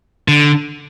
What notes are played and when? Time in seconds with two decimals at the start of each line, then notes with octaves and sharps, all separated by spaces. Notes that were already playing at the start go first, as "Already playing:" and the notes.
0.28 D3